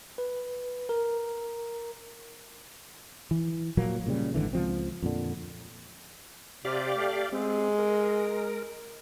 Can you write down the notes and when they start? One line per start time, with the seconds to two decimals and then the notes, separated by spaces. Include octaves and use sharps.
0.18 B4
0.89 A#4
3.31 E3
3.77 A#2 F3 F#3 A#3
4.06 A#2 C#3 G3
4.34 G#1 D3 E3
4.53 C#2 F3 C4
5.02 F2 A#2 D3
6.65 C3 G4 D5 F5
6.96 A3
7.32 G#3 C4
7.78 A#4